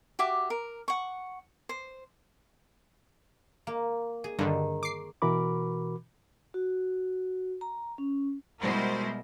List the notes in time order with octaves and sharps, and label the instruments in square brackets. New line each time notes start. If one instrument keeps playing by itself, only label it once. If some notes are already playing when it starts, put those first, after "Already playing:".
[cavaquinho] F#4 G4 E5 D6
A#4
F#5 C#6
C5
[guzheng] A#3
G#4
[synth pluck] G2 D3 [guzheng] D#3
[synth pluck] D6 C7
[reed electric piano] B2 E3 F#4 A#4 B5 D6
[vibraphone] F#4
A#5
C#4
[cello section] B2 G3 G#3 E4 A#4 C5